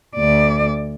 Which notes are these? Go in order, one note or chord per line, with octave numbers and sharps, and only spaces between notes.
D2 D5